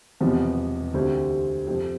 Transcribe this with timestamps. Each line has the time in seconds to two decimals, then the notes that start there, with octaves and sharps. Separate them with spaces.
0.21 E1 E2 C3 F3 B3
0.94 D2 C3 G3 C4 G4
1.67 F2 C3 F3 C4